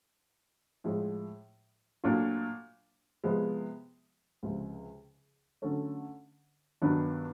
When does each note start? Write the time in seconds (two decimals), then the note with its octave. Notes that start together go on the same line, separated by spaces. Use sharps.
0.84 A2 F3 G#3
2.04 A#2 F#3 A3 D4 F4
3.24 C3 F3 G#3 B3
4.43 C#2 C3 F3
5.62 D3 F#3 A3 C#4
6.82 G2 D#3 F#3 B3 D4